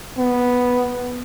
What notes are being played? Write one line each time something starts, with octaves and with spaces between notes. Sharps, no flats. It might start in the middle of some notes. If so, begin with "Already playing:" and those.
B3